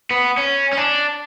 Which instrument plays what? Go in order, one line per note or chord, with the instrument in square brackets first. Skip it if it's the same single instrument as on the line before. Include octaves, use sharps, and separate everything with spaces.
[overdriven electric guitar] B3
C#4
C#4
D4